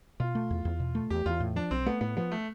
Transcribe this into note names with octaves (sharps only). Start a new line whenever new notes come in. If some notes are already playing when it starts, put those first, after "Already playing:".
B2 F4
A3
E2
E2
B2
A3
E2 G4
E2 F4
A2
F3 D4
B1 C4
A3 B3
A2 B3
F3 B3
A3